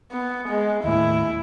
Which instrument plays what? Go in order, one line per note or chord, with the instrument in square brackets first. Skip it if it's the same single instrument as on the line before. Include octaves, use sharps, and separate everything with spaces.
[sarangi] B3
G#3
[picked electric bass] D#2 A2 [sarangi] E4